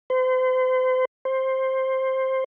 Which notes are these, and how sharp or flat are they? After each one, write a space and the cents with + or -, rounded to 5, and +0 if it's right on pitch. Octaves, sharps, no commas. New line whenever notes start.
C5 -35
C5 +10